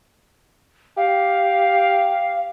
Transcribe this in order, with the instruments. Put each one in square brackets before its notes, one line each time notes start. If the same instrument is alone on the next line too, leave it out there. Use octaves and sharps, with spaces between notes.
[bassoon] G4 [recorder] F5